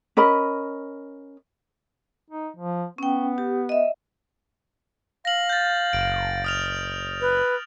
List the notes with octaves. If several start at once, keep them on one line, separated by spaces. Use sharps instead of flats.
C#4 A#4 D#5 B5
D#4
F3
B3 C#4 G5
G4
D#5 E5
F5 A#6 F#7
G6 A6
F#1 D7
D#6 F6 F7
B4